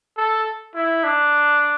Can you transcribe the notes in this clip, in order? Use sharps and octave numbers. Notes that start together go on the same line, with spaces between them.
A4
E4
D4